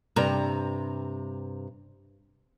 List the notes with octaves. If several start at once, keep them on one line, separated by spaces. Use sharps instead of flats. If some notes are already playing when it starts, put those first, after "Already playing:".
G2 C3 A#5